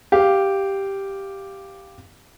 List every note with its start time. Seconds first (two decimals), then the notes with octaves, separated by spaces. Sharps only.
0.12 G4 F5